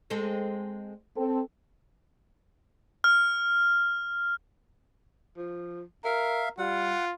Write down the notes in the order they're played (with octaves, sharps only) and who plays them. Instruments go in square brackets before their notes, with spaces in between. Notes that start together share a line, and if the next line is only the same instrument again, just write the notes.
[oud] G#3 C4 A4
[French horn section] C4 A4
[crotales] F6
[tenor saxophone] F3
[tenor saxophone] A#4 [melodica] E5 F5
[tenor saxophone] G3 [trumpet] F4 [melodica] F#5